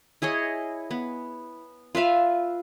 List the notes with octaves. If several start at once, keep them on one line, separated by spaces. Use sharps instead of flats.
E4 G#4 C#5 D#5
B3
F4 B4 E5 F5